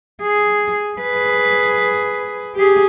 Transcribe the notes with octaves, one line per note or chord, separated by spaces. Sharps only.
G#4
G#4 B4
G4 G#4